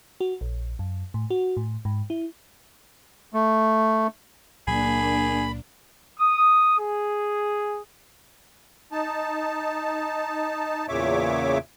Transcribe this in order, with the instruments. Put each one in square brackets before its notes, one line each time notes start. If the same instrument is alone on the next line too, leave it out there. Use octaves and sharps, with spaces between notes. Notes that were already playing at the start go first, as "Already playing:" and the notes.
[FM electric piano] F#4
A#1
F#2
A2
F#4
A2
G#2
E4
[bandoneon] A3
[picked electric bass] C#2 A#2 F#3 [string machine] A#3 D4 [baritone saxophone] G#4 [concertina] B5
[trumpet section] D#6
G#4
[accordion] D#4 A5
E2 A#2 C#3 C#5 E5 D6